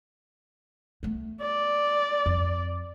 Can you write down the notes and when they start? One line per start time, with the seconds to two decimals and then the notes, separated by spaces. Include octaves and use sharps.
1.03 A3 B3
1.42 D5
2.26 F2